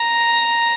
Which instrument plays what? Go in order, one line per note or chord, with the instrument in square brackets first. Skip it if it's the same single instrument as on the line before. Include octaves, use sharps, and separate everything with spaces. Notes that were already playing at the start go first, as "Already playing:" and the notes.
Already playing: [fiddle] A#5